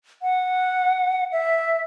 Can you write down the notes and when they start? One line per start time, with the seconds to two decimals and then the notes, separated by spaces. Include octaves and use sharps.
0.22 F#5
1.32 E5